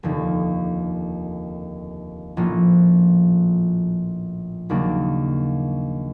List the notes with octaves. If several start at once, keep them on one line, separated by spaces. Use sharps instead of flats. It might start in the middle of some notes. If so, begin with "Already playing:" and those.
F1 D#2 D3
A#1 A2 F3 A#3 C#4
D#2 C#3 F#3 A#3 D4